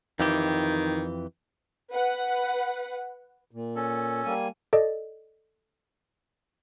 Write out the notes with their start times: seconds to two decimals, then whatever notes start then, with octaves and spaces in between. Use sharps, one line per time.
0.20 F2 D#3 E3 G4
1.91 B4 F#5
3.51 A#2
3.76 C#4 A4
4.25 G3 A#3 G#5
4.73 A4 D5 D#5